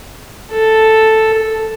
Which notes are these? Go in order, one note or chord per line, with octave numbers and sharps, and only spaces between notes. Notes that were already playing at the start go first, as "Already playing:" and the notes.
A4